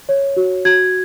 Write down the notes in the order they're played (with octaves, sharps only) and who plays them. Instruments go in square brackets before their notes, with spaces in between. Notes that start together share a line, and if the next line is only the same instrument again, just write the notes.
[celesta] C#5
F#4
F#4 G#6